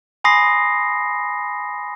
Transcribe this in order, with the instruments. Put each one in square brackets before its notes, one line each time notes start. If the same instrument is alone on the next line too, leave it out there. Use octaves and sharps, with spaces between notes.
[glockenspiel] G#5 B5 C6 D#6 A#6 C7